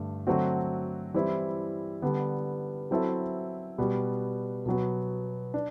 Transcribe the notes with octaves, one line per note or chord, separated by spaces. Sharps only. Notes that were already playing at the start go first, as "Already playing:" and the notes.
Already playing: G2 D3 A3
D3 F#3 A3 C4 F#4
E3 G3 C4 E4
D3 G3 B3
F#3 C4 E4 A4 E5
B2 G3 B3
B2 F#3 B3
D4